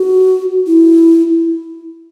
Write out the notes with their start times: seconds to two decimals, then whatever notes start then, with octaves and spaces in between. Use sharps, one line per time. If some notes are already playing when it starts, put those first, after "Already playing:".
Already playing: F#4
0.67 E4